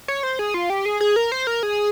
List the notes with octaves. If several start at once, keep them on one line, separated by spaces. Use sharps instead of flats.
C#5
C5
G#4
F4
G4
G#4
G#4
A#4
C5
A#4
G#4